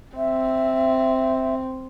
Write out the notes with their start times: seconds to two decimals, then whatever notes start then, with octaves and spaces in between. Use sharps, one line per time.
0.16 C4 E5